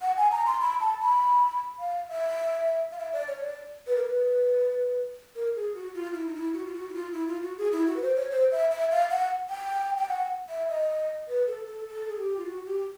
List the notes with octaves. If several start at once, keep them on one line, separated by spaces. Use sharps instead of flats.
F#5
G#5
A#5
C6
B5
A5
B5
F5
E5
F5
E5
D5
C#5
D5
B4
A#4
B4
A#4
G#4
F#4
F4
E4
D#4
E4
F#4
F4
F#4
E4
F4
E4
F4
F#4
G#4
E4
F#4
B4
C5
C#5
C5
E5
E5
F5
F#5
G5
G5
F#5
E5
D#5
B4
A4
A4
A4
G#4
G4
F4
F#4
G4